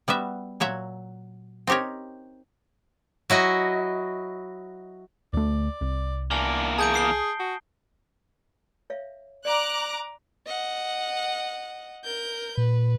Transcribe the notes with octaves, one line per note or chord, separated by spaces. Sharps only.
G3 B3 F#4 E5
A#2 F#3 C#5 E5
C4 D#4 G4 A#4 C#5
F#3 E4 F#4 D#5
D2 A3 D5
C2
E2 A#3 D4 G#5
G#4 A5 G6 D7
D#6 C7 G7
F#4
C#5 E5 F5
D5 F5 A#5 D6 F#6
D#5 F#5
A#4 G6
A#2 B4